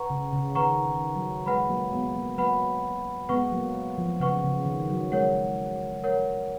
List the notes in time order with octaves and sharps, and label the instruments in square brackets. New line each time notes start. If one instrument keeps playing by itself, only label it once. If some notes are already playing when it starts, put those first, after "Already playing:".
Already playing: [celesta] B4 F#5 A#5 C#6
[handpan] C#3
C#3
[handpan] D#3 [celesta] B4 F#5 A#5 C#6
[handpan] D#3
F#3
[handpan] G#3 [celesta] B4 F#5 B5
[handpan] F#3 A#3
G#3 B3
F#3 A#3
[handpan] F#3 A#3 [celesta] B4 F#5 B5
[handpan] G#3 B3 [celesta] B4 F#5 C#6
[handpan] F#3 A#3
F3
[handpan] C#3 [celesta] B4 F#5 C#6
[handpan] C#3
D#3
F#3
[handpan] G#3 [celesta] A#4 C#5 F#5
[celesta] A#4 C#5 F#5